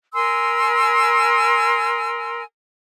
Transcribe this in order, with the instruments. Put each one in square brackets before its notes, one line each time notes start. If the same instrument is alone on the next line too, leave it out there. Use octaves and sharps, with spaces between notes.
[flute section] A#4 G#5 C6 E6